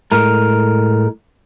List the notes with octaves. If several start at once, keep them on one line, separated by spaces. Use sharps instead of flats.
A2 G#3 A#4